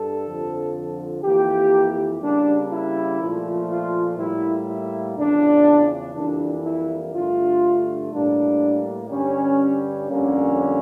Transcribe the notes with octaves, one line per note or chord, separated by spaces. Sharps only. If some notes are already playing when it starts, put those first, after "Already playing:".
Already playing: G2 A4
F2 D3 F3
F2 E3 A#3 G4
C#3 G3 A#3 D4
E4
A#2 F3 A3
F4
A2 G3 A#3 E4
E4
E2 C#3 F3 D4
F2 E3 G3 A#3 D4
E4
G2 D3 A3 F4
A2 G3 A#3 D4
G2 D3 G3 C#4
F2 D3 G3 A#3 C#4